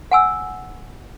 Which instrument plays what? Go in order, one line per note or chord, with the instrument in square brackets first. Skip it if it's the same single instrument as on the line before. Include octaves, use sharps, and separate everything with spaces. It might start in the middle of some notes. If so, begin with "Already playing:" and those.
[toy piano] F#5 G#5 E6